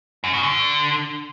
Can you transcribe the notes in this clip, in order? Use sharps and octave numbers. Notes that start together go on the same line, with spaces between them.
F#2
B2
D3